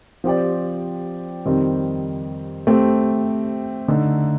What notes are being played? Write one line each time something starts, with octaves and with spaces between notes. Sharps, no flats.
F3 C4 G4 D5
F2 D#3 G3 C4
A3 C4 G4
D3 A3 D#4